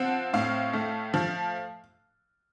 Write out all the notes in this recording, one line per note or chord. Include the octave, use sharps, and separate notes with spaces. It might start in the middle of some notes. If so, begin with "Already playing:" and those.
Already playing: F3 C4 F#5
A2 F5
A3
F3